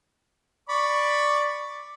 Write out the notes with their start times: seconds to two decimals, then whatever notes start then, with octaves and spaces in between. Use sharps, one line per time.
0.69 D5 B5 C#6